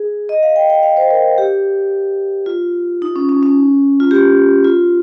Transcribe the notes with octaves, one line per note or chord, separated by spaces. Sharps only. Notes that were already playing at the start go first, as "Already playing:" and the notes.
Already playing: G#4
D#5
F5
G5
G5
F5
C5
A#4
G4
F4
D#4
C#4
C#4
C#4
F4
G4
F4